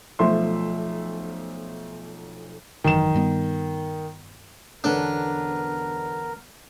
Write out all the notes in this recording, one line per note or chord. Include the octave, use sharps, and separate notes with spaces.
B1 F3 A3 E5 C6
G#1 F#2 D#3 E3 E7
G2 G3 B3
E1 D3 B3 C#4 D4 A4 A#4 C#5